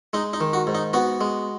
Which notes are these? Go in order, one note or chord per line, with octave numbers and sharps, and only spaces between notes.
G#3 D#4
D#4
D#3
F#4
G#2
D#4
B3 F#4
G#3